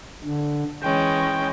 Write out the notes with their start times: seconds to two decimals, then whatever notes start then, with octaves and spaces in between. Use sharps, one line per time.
0.24 D3
0.82 E3 G#3 C#4 G5